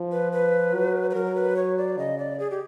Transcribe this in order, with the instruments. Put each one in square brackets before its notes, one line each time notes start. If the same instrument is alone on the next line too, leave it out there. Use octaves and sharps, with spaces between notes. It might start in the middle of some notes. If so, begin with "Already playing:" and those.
Already playing: [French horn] F3
[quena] B4
B4
[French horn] F#3
[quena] B4
[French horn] F#3 [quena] A#4
[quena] B4
C#5
D5
[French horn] C#3 [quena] D#5
[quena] D5
G#4
G4